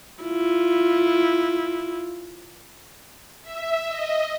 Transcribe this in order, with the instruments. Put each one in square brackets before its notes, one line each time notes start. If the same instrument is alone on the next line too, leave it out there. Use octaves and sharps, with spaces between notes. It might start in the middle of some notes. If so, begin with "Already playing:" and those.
[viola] E4 F4
[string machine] E5
D#5